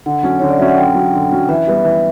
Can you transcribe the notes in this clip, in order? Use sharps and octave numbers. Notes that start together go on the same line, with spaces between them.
D3 F#5
F#3 C#4
D3 C#5
D5
F#3 C#4 E5
F#5
D3 G5
F#3 C#4
D3
F#3 C#4
E3 E5
G3 B3
E3